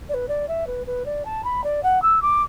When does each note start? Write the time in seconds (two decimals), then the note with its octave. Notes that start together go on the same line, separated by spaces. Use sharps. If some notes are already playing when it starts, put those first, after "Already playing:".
0.09 D5
0.14 B4
0.28 D5
0.48 E5
0.67 B4
0.87 B4
1.06 D5
1.25 A5
1.44 B5
1.64 D5
1.83 F#5
2.02 E6
2.22 D6